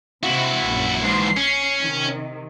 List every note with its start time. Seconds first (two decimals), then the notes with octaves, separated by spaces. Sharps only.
0.23 C3 C4 E4 F#4
0.65 A#1 F#2
1.04 G#2 E3 C7
1.37 C#4
1.81 C3 D#3